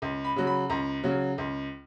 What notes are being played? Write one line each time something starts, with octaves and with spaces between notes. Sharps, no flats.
C#2
B5
C#3 F#3
B5
C#2 A#5
C#3 F#3
C#2